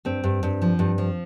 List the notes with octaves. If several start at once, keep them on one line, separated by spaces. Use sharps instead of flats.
G2 C4
G2
G2
F3
G2
F3